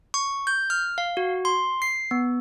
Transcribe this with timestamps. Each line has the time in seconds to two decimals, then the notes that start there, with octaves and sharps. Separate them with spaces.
0.14 C#6
0.47 G6
0.70 F6
0.98 F5
1.17 F#4
1.45 C6
1.82 C7
2.11 B3